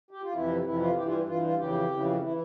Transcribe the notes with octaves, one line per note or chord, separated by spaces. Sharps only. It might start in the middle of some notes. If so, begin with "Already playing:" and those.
G4
F4
F2 C3 E3 E4
F2 C3 E3 E4
F4
G2 E3 G4
F4
G2 E3 F4
F4
F2 C#3 E3 G4
F2 C#3 E3
E3 E4